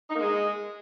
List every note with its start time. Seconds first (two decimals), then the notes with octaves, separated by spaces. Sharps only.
0.10 D#4
0.15 A#3
0.21 G#3